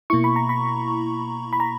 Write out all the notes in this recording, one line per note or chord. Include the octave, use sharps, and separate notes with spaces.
B2 A#3 E4 C#6
B5
A#5
B5
B5
A#5